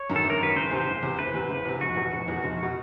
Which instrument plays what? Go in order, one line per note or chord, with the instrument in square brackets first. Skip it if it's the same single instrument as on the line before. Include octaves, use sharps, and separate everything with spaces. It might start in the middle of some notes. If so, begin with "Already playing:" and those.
Already playing: [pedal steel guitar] C#5
[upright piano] F#2 D#3
[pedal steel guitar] A4
[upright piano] G1
[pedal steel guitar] A#4
[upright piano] F#2 D#3 [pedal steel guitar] B4
[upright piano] F#1 [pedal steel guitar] C5
[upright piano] E2 C3
F#1
E2 C3
[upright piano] F#1 [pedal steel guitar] B4
[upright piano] E2 C3
F#1
E2 C3
[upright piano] F1 [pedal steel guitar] F#4
[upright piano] E2 B2
F1
E2 B2
F1
B2